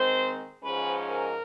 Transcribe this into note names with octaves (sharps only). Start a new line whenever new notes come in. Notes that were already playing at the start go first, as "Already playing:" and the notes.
Already playing: D#3 G#3 C4 C5
G#2 F3 G#3 C#4 B4
A#4